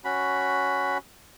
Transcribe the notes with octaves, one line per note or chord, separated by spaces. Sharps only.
C#4 F#4 B5